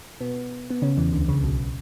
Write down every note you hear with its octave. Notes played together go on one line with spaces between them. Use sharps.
B2 B3
B3
C#3 C#4
E2 E3
D2 D3
C#2 C#3
B1 B2